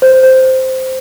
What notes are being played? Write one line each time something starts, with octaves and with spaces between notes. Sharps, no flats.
C5
C5